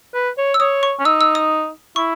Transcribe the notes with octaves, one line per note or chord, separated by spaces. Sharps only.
B4
C#5
E6
C#5 D#6
C#6
C#4
D#4 E6
E6
D#6
E4 C#6